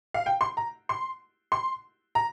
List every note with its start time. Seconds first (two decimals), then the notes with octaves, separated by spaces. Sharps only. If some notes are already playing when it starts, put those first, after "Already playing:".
0.14 F5
0.26 G5
0.41 C6
0.57 A#5
0.89 C6
1.52 C6
2.15 A#5